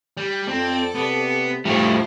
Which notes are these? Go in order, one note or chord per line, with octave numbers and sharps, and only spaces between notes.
G3
F2 C4 A4 D5
C3 B3
A2 F3 G3 A3 D4 E4 C5